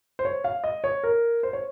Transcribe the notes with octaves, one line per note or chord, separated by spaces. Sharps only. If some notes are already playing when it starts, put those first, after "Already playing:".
C5
C#5
F5
D#5
C#5
A#4
C5
C#5